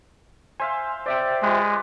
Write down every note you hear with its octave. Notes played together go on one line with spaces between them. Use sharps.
C5 E5 F5 G#5
C5 D5 E5 G5
G#3 F4 G4 B4